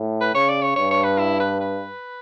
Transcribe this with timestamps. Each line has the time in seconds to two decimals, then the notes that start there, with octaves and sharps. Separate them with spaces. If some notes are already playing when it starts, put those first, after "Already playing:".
Already playing: A2
0.21 B4
0.35 C#3 C#5
0.49 D5
0.63 C#5
0.76 G2 C#5
0.91 C#5
1.04 B4
1.19 E4
1.40 B4
1.60 B4